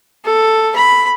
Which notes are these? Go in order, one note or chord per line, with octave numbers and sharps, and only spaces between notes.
A4
B5